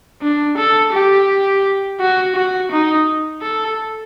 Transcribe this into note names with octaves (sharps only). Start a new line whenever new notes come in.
D4
A4
G4
F#4
F#4
D#4
A4